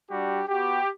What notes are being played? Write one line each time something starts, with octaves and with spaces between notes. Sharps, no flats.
G3 D4 F#4 G4
B3 F#4 G4